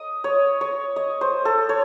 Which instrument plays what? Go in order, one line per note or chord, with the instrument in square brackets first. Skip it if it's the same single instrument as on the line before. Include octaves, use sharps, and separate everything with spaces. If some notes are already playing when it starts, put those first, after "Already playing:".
Already playing: [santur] D#5
C#5
C#5
D#5
C5
A4
C#5